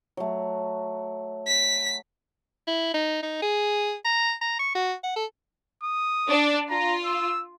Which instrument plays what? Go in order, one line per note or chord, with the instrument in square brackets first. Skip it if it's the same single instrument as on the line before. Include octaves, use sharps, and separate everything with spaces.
[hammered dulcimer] F#3 A3
[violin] B6
[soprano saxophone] E4
D#4
D#4
G#4
A#5
A#5
C#6
F#4
F#5
A4
[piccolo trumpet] D#6
[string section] D4
[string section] F4 [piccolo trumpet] A#5
[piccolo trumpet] E6